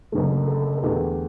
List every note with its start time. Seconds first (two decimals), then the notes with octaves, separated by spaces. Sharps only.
0.12 F#1 F#2 D3 A3
0.48 A4
0.77 A4
0.83 E2 D3 A3 G4